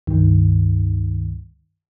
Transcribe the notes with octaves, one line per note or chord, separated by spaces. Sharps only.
C#2 G2 D#3